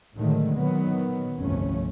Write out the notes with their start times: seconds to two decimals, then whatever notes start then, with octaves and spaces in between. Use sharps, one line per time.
0.17 A2 D3 D#3 F#3 G#3 A3
0.56 A#2 D#3 F#3 B3
1.39 G1 C2 F2 A3 C#4